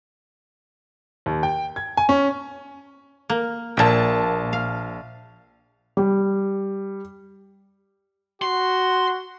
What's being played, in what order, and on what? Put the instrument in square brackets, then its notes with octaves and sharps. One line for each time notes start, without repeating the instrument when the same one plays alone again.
[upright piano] D#2
G5
G#6
G#5
C#4
[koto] A#3
[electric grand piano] A#1 A5 [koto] A#2 G5
[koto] F5
[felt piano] G3
[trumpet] F#4 [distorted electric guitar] C6